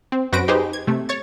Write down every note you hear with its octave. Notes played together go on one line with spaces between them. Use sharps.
C4
F#2 F#4 B4 C5 A#6 D7
D#4 G4 G#4 B4 C5
G#6
C3 A3
C#5 C#6 A6